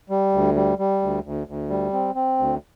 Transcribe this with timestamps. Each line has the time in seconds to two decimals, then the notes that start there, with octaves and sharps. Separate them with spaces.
0.10 G3
0.32 D2
0.55 G3
0.78 G3
1.02 D2
1.24 D2
1.47 D2
1.70 G3
1.93 C4
2.15 C4
2.38 D2